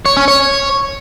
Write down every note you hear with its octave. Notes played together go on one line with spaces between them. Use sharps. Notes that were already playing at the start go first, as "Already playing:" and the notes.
C#5
C#4
C#5